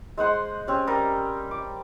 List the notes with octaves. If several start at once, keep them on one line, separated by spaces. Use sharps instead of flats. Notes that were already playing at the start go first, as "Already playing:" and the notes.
G#3 C5 F#5 C6
C4 C#4 G4
G3 A#4 D#5
D6